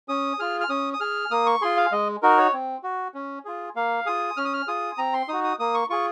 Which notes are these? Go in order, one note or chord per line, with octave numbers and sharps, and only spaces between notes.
C#4 D#6
F4 G#4 F6
F6
C#4 D#6
D#6
G#4 F6
A#3 D#6
C#6
F4 G#4 C6
F5
G#3 D#5
D#4 F#4 A#4
C#5
C4
F#4
C#4
F4 G#4
A#3 F5
F4 G#4 D#6
C#4 F6
D#6
F6
F4 G#4 D#6
C4 A#5
C6
D#4 F#4 D#6
D#6
A#3 D#6
C#6
F4 G#4 C#6